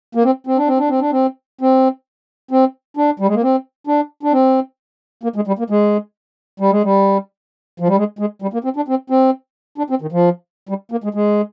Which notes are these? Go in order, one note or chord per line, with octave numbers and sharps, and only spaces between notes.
A#3
C4
C4
D4
C4
D4
C4
D4
C4
C4
C4
D4
G3
G#3
A#3
C4
D4
D4
C4
A#3
G#3
G3
A#3
G#3
G3
G#3
G3
F3
G3
G#3
G#3
G3
A#3
C4
D4
C4
C4
D4
C4
D#3
F3
G3
A#3
G#3
G#3